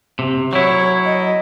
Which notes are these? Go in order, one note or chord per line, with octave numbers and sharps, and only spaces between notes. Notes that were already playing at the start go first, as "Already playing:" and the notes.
C3
F#3 E4 C#5
D#5